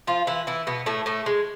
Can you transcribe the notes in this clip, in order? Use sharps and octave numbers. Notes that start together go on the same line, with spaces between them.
F3 F4
E3 E4
E3 E4
B2 B3
A2 A3
A2 A3
G#3